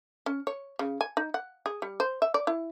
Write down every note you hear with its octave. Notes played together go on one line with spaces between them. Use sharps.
C#4
C#5
C#3
G#5
D#4
F#5
G#4
G3
C5
E5
D5
E4